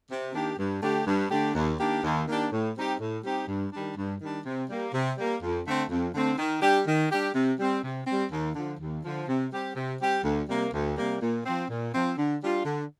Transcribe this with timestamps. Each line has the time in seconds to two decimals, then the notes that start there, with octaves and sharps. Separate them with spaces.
0.11 C3
0.34 D#3 A#3 D4 G4
0.59 G2
0.83 D3 A3 D4 G4
1.07 G2
1.30 D3 A3 D4 G4
1.55 D#2
1.79 D#3 A#3 D4 G4
2.04 D#2
2.28 D#3 A#3 D4 G4
2.52 A2
2.77 G3 C4 D#4 G4
3.00 A2
3.24 G3 C4 D#4 G4
3.48 G2
3.72 D#3 G3 D4
3.97 G2
4.20 D#3 G3 D4
4.46 C3
4.69 G3 A#3
4.93 C3
5.17 G3 A#3
5.42 F2
5.65 D3 A3 C4
5.89 F2
6.14 D3 A3 C4
6.38 D#3
6.62 G3 D4 G4
6.87 D#3
7.11 G3 D4 G4
7.34 C3
7.59 G3 C4
7.84 C3
8.07 G3 C4
8.31 D#2
8.55 D3 F3
8.80 D#2
9.04 D3 F3
9.28 C3
9.52 G3 C4 G4
9.75 C3
10.01 G3 C4 G4
10.24 D2
10.49 C3 G3 A#3
10.73 D2
10.97 C3 G3 A#3
11.22 A#2
11.46 F3 C4
11.70 A#2
11.93 F3 C4
12.17 D3
12.42 G3 D4 F4
12.65 D3